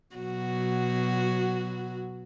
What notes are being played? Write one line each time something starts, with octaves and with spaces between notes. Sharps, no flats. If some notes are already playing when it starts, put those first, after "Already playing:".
B2 F#3 F#4